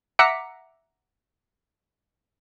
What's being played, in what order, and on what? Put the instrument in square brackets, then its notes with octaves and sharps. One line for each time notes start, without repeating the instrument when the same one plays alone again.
[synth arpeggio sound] E5 F#5 A#5 D6 B6 C#7